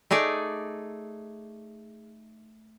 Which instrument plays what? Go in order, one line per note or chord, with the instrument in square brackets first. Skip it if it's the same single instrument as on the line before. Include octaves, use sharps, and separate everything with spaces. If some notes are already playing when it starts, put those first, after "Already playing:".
[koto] A3 D#4 G#4 D5